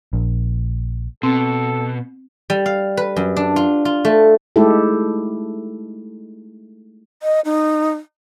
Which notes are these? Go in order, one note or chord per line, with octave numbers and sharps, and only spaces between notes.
A#1
B2 C4 A4
G3
F5
B4
F#2
D4
F4
F4
A3
G#3 A3 D#4 E4 G4 A4
D#5
D#4